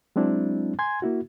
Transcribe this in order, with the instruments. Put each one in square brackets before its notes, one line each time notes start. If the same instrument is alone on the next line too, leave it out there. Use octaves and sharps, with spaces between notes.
[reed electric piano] F#3 G#3 C4 D4 E4
G#5 C6 G#6
A#3 E4 F#4